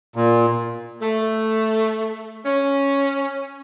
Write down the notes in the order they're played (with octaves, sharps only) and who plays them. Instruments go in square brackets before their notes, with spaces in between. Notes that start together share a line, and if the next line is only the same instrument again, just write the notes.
[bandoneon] A#2
[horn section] A3
C#4